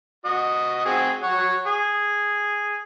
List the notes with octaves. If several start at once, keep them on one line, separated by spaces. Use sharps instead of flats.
F#4 D#5
C4 F#4 G#4
C#5 F#5
G#4